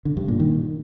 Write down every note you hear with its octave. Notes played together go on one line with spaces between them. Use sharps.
D3
G2
A#2
D#3